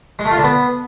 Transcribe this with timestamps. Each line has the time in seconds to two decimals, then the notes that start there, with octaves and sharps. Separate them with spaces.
0.19 G#3
0.25 A3
0.31 F4
0.37 D3
0.44 B3